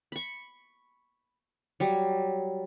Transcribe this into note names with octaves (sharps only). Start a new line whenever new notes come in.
B5 C#6
F#3 G3